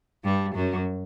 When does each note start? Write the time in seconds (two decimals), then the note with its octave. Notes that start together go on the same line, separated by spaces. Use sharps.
0.24 G2 G3
0.54 F#2 F#3